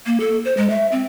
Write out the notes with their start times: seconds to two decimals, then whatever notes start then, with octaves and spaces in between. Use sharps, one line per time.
0.06 A#3
0.20 A4
0.45 C5
0.57 G#3
0.70 E5
0.92 C4